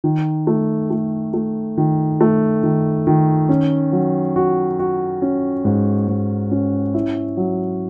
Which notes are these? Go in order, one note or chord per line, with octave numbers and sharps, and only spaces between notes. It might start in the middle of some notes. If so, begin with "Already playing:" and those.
D#3
A3
A3
A3
D#3
A3
D#3
D#3
C#4
F#3
F#4
F#4
C#4
G#2
G#2
C#4
E4
F#3